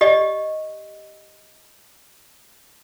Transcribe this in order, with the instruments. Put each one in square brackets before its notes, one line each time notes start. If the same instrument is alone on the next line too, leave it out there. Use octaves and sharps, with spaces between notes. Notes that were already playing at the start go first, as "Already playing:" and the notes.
[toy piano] G4 D5 D#5